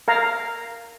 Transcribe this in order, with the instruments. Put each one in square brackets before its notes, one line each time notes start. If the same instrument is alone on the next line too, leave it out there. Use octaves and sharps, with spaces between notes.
[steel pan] A#4 F5 A#5